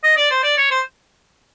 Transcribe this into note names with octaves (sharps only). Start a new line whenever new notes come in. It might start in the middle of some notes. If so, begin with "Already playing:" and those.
D#5
D5
C5
D5
C#5
C5